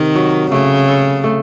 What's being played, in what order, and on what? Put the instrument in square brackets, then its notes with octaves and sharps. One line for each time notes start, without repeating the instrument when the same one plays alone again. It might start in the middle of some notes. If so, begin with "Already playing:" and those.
Already playing: [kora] C3 [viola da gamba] D#3
[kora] F#3
[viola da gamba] C#3 [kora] A3
[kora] A4
A3